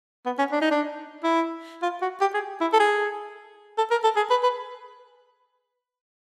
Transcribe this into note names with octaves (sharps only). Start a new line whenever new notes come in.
B3
C#4
D4
D#4
D4
E4
F4
F#4
G4
G#4
E4
A4
G#4
A4
A#4
A4
G#4
B4
B4